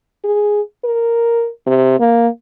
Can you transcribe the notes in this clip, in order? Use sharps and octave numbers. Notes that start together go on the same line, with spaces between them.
G#4
A#4
C3
A#3